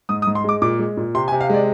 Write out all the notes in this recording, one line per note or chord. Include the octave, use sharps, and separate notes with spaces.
G#2 D#6
D#6
G#2
C6
G#3 D6
A#2 D6
G#3
A#2
C3 C6
G#5
C3
F5
G#3 D5